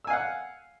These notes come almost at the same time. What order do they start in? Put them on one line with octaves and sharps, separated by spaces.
E6 G#5 F5 F#5